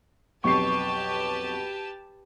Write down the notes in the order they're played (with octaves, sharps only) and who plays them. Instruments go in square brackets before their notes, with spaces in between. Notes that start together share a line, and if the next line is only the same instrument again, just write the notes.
[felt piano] B1 F2 C7 [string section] G4 B4 A5 [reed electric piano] C#6